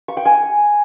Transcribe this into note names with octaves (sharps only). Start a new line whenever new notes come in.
C#6
G5
G#5